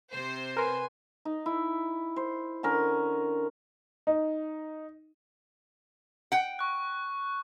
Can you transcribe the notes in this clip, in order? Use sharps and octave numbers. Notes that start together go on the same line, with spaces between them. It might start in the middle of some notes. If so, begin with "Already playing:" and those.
C3 C5
A#4 B4 G#5 C6
D#4
E4
C5
D3 C#4 A#4
D#4
F#5 G5
C#6 F#6